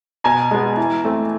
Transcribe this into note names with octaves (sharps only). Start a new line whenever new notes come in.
B2 G#5 A#5
G#3 B3
E3
A3 C4